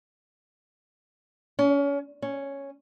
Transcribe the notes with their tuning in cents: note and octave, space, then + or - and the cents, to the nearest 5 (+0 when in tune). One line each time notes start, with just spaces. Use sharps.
C#4 +30
C#4 +0